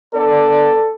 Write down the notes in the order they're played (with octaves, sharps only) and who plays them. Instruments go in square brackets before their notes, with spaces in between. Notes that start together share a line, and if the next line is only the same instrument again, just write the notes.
[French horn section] B3 D4 D5 [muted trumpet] A4